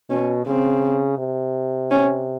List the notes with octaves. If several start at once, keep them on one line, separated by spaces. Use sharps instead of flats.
B2 C#4
C#3 C4
C3
C#4